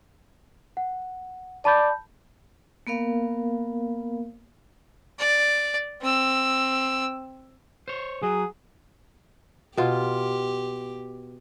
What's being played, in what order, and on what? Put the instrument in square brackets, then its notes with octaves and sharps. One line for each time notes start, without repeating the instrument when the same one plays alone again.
[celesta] F#5
[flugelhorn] D5 [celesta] A5 B5 G6
[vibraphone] A#3 B3 A#4 F5
[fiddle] D5
C4 E6
[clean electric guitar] C5 C#5
[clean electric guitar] F#3 [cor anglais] G#4
[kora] B2 F4 [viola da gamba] G4